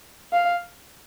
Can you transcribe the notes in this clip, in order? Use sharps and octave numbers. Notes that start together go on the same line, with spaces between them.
F5